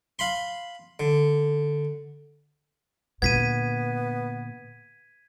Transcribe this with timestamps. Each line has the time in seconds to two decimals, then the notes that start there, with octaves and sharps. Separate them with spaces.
0.19 F5 B5 C6
1.00 D3
3.22 A#2 D3 B3 G#6 B6 D#7